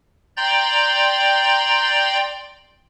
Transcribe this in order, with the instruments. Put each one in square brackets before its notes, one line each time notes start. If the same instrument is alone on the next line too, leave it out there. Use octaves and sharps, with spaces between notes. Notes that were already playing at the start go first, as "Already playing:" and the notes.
[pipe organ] D5 G5 A#5 C6 G6 A6